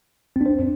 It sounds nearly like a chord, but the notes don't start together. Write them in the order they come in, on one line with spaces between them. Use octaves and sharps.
C4 D4 C5